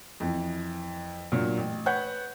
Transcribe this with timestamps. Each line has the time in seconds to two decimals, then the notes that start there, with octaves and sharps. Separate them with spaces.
0.20 F2 E3
1.32 G2 A#2 F#3
1.58 A1
1.86 B4 C#5 F#5 F#6 G6